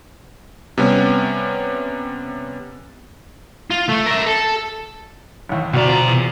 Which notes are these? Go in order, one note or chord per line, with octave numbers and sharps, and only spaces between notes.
C3 G3 B3 C#4
F4
A3
A#4 E5
A4
A1 D#2
D2 B2 F#4 D5 A#5
F3
E2